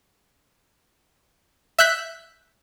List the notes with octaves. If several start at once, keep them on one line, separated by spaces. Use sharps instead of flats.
E5 E6 F#6 G6 B6